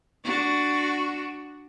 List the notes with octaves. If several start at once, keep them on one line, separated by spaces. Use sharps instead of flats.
D4 F#4